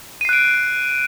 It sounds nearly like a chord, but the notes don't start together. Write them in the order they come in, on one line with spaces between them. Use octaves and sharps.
D#7 C7 F#6 D7